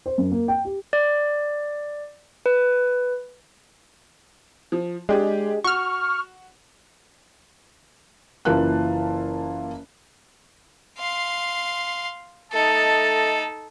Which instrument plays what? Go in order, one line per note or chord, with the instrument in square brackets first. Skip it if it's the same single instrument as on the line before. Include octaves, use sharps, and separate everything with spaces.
[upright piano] C5
F#2
A#3
G5
G4
[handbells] D5
B4
[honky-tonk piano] F3
[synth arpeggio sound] G#3 [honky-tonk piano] D4 G4 G#4
[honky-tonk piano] F#4 [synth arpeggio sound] C#6 F6
[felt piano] F#1 E3 A#3 F4 A5 F#6
[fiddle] F5 C6
[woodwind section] A3 D#5 A5 [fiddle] D#4 A4